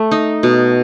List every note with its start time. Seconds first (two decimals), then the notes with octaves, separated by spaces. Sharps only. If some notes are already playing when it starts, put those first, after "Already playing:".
Already playing: A3
0.11 D#4
0.43 B2